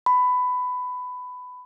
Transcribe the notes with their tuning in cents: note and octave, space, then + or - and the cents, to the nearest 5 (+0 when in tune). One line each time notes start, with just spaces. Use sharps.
B5 +15